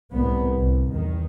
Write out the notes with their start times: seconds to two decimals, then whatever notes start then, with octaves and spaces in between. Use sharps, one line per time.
0.13 C2 A2 B3
0.57 C2
0.90 E2 D#3